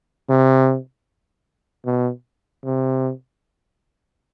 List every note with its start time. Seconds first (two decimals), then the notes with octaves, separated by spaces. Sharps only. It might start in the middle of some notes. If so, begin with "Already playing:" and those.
0.29 C3
1.86 B2
2.64 C3